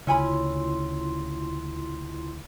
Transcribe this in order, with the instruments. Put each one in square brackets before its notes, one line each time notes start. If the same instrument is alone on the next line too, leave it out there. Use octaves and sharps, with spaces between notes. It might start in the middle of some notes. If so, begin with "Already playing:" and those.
[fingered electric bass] D2 C#3 [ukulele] C#4 G#5 B5 [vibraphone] E4 F4 C6